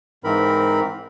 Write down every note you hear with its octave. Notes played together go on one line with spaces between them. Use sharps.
G#2 E3 C4 A#4 B5